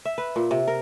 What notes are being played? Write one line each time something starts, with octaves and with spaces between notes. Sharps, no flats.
E5
B4
A#2
C3
A#4